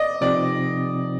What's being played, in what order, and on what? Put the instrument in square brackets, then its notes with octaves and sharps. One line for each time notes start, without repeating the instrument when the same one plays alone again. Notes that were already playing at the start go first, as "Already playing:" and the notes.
Already playing: [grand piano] D5 D#5
[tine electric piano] C3 F3 C4 D#4 [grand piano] D5